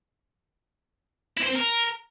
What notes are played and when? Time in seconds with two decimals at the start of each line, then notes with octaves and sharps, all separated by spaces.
1.37 E4
1.43 C5
1.49 C4
1.55 A#4